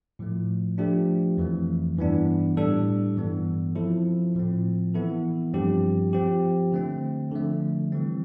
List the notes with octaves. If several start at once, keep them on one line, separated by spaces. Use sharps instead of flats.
A2 F3 A3
F3 A3 D4 G4
F2 E3 A3
G2 E3 B3 D4
A2 G3 D4 A4
G2 E3 B3
F3 C4 E4 A4
A2 F3 C4
E3 B3 E4 A4
G2 F3 C4 G4
F3 C4 G4
D3 A3 C4
D3 F3 A3
E3 G3 C4